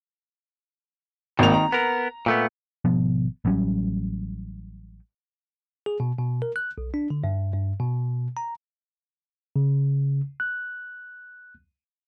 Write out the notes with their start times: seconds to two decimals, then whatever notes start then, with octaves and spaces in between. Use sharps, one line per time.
1.39 G#1 D#3 A#3 F7
1.54 A#5
1.72 B3 A#4
2.26 A#2 A3 B3
2.85 G#1 B2 F3 B3
3.45 A1 F#3 G3 C#4
5.86 G#4
6.00 B2
6.18 B2
6.42 A#4
6.56 F#6
6.78 B1
6.94 D4
7.10 D3
7.24 G2
7.54 G2
7.79 B2
8.37 A#5
9.56 C#3
10.40 F#6